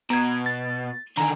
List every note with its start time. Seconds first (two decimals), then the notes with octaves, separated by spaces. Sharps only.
0.10 B2 A#5 G#6
0.46 A6
1.17 D3 D#3 G#5 A#5